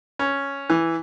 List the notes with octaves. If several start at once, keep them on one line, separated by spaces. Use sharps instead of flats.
C#4
E3